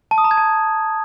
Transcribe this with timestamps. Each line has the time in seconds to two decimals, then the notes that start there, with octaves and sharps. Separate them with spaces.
0.11 A5
0.18 D#6
0.24 A#5
0.31 G#6
0.38 A5